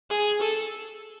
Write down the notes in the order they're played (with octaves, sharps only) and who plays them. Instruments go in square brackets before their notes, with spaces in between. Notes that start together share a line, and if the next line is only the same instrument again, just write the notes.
[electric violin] G#4
A4